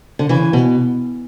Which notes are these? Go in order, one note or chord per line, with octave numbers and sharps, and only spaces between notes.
D3
C#3 E3
B2